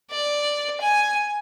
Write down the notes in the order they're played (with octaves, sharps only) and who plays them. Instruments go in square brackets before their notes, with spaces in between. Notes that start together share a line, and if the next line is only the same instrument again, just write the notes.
[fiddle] D5
G#5